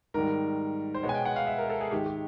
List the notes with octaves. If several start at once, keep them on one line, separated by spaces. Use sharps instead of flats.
G#2 D#3 G3 A#4
C5
B2 G#3 B3 C#5
G#5
G5
F#5
F5
E5
A#4
A4
G#4
G#2 D#3 G#3 G4
G4